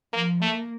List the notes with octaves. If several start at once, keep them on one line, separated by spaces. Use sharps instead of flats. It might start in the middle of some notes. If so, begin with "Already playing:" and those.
F3 A#3
A3 A#3